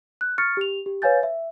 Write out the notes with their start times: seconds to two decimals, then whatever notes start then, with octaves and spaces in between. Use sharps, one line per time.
0.21 F#6
0.38 C#6 F6 A6 C#7
0.57 G4 F7
0.86 G4
1.02 B4 C#5 F5 G#5 G6 A6
1.23 E5